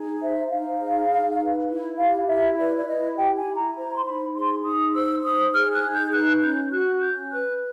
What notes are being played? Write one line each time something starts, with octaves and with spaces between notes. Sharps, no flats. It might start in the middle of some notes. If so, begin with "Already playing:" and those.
Already playing: D#4 G#4
C5 E5
D#4 F5
G#4
D#4
B4
E4
G4 F5
E4 E5
B4 D5
D5
E4 D#5
G4 G5
G#5
E4
A#5
C5 A#5
C6
D#4 B5
G#4 C6
D#4 D#6
C5 E6
D#4 D#6
G#4 F6
F#6
D#4
G6
B4 F#6
C#4 G6
F#4 F#6
C#4 G6
B4 F#6